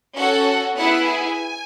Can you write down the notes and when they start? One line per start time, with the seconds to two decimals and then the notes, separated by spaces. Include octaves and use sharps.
0.16 C#4 F#4 A4 F#5
0.77 B3 E4 G#4 F#5
1.07 G#5